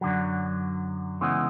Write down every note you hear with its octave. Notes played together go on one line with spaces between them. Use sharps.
F#2 D3 F#3
C#3 E3 G#3 B3